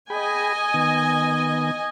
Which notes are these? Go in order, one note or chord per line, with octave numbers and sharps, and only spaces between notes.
G#4 D#5 G5 G#5 B5
D#3 B3